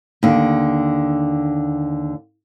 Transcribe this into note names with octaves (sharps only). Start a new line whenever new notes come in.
D#2 D3